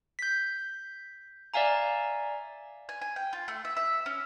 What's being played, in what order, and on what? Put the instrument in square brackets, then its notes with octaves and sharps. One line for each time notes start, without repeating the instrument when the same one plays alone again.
[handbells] G6 B6
D5 E5 F5 G#5 A#5
[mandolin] G#5
G#5
G5
F4
A3
E5
E5
C#4